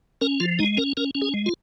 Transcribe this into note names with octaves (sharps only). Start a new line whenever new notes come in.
C#4 A#4
F3 F4
G#3 D#4
C#4 A#4
C#4 A#4
C#4
G#4
G#3
F4